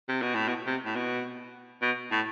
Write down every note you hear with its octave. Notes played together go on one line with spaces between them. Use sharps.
C3
B2
A2
B2
C3
A2
B2
B2
A2